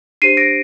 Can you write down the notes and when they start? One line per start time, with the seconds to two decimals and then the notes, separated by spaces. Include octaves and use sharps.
0.22 D4 G4 C5 C7 D#7
0.37 A#6 D7